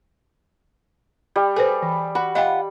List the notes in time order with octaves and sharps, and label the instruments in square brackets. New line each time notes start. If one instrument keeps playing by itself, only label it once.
[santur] G3
[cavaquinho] G#4 [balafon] A4 B4 C5
[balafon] E3
[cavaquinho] F#4 [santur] B5
[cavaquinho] F4 F#5 [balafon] D#5 G5